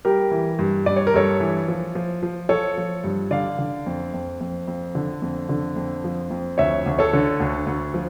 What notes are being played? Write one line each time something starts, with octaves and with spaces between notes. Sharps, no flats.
G3 G4 A#4
E3
G2
G2 D5
C#5
A#4
G2 A4 C#5
E3
F3
F3
F3
F3 A4 C#5
F3
G2
D3 D5 F5
D3
F2
F2
F2
F2
D3
F2
D3
F2
F3
F2
D2 C#5 E5
D2
A4 C#5
D3
D2
D2
F3